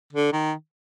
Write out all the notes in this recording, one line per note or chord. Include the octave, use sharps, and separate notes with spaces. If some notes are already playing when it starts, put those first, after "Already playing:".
D3
D#3